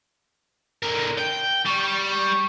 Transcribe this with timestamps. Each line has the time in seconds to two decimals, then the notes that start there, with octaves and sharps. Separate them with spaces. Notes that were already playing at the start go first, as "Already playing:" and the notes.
0.83 D3 A#4
1.19 G5
1.66 G3 C#6